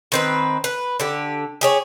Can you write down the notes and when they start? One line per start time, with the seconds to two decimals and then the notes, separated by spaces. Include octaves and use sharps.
0.12 D#3 C4 B4
0.64 B4
1.00 D3 G4
1.61 G4 G#4 C#5